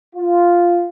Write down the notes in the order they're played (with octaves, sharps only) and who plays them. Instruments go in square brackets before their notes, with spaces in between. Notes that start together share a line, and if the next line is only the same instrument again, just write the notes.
[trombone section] F4